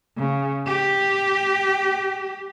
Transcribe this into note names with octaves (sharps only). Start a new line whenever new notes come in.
C#3
G4